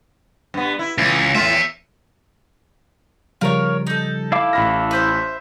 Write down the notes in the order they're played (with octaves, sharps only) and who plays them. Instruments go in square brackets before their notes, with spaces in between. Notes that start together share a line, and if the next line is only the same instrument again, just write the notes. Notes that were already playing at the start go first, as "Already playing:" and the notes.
[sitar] G2 B3
E4
[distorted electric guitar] C#2 [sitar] E3
[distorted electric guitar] E2 E5 [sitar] A2 F4
[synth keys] C#3 F3 G3 [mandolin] F4 A#4 C#5
[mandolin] D#4 A4
[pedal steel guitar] E4 F5 D6
[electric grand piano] A1 B5 A#6 [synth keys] F6
[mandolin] B4 C5 E5